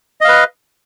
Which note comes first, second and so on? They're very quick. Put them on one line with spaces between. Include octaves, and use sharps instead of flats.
D#5 F5 B4